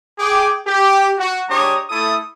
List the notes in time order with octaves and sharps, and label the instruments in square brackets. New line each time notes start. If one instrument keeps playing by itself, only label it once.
[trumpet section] G#4 G5 D6
G4
F#4
G#3 D4 G4 C#5 A#5 D#6
A3 E4 A4 D#6